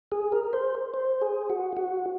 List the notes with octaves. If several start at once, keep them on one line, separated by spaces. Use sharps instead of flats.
G#4
A#4
C5
C5
G#4
F#4
F#4